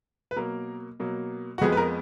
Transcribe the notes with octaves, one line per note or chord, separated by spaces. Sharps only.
B4
B2 F#3 A#3 A#4
B2 F#3 A#3
F#4
F2 F3 G#3 B3 G#4
B4
A#4